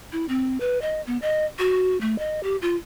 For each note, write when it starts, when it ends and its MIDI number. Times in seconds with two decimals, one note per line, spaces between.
0.12 0.26 64
0.29 0.58 60
0.60 0.80 71
0.82 1.01 75
1.07 1.18 59
1.22 1.45 75
1.59 1.99 66
2.01 2.19 57
2.19 2.43 75
2.43 2.56 67
2.62 2.76 65